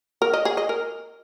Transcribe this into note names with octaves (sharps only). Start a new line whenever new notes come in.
A#4
D#5
G#4
D#5
A#4